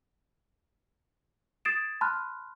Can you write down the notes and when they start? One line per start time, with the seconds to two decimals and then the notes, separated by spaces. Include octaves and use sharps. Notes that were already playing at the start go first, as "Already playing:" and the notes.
1.65 D#6 G#6 A6 C7 D7 E7
2.01 A5 B5 C6 F6 F#6